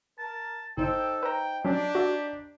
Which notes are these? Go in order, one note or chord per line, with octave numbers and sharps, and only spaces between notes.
A#4 A5
G1 D#4 A4 C5 G5
B4 G5 A#5
F#3 C#4 D4 G4
F#4 E5